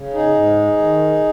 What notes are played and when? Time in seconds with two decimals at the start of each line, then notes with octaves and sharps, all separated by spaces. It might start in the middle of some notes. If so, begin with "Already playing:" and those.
Already playing: C#3
0.13 D#4 G#4
0.34 G#2
0.77 D#3